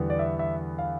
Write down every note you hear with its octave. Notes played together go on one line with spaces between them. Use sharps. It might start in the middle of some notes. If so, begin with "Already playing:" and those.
Already playing: E2 D3 G3 B3
D5
E5
E5
F5